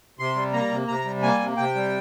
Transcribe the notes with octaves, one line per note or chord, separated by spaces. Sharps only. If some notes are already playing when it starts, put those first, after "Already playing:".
C3 C6
G3
A#3 A#5
C3
C3 A#5
G3
A#3 G#5
C3
C3 G5
G3